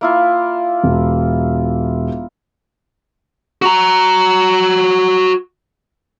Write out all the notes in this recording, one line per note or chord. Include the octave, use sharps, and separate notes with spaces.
A#3 E4 F4
E1
F#4 A#5